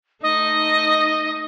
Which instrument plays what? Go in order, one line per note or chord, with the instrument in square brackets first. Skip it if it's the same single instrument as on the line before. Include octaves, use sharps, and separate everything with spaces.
[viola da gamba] A3 D#4 [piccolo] D#5